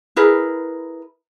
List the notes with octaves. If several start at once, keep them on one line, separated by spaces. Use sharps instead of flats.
E4 G#4 A#4 B4